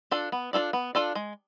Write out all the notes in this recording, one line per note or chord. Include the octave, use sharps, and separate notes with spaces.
D4 F4 A4 D5
B3
D4 F4 A4 D5
B3
D4 F4 A4 D5
G#3